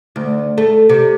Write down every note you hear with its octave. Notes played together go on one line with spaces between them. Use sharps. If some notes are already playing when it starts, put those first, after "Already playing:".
D2
A3
C3